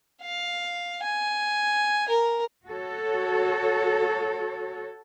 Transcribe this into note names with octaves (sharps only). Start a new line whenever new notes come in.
F5
G#5
A#4
F#4 A4 C#5